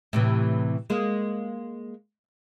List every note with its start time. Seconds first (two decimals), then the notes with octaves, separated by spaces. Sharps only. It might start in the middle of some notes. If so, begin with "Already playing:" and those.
0.13 A2 C3 E3
0.90 G#3 A#3